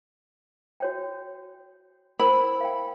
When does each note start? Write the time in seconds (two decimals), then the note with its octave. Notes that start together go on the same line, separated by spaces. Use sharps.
0.80 F#4 C#5 G5
2.19 E4 A#4 C5 B5
2.61 F5 G5